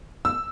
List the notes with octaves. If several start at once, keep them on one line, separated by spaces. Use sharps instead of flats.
E6